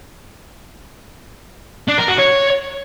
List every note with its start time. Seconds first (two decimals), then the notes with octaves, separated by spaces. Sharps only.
1.89 D4
1.99 A#4
2.09 F#4
2.19 C#5